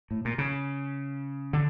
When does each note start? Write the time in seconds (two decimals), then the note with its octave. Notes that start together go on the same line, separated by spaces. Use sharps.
0.11 A2
0.25 A#2
0.38 C#3
1.53 D3